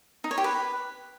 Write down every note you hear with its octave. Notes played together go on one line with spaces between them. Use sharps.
D#4
C#5
G4
B4